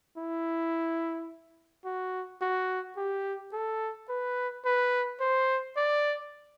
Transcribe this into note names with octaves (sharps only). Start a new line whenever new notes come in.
E4
F#4
F#4
G4
A4
B4
B4
C5
D5